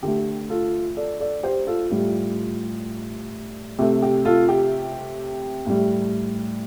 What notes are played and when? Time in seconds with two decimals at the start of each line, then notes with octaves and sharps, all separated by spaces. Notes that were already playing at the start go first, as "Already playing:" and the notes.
0.03 D3 A3 G4
0.50 F4 A4
0.97 A4 D5
1.20 A4 D5
1.43 G4 C5
1.67 F4 A4
1.91 A2 G3 F4
3.79 C3 A3 G4
4.02 G4
4.25 F4 A4
4.49 G4
5.66 A2 G3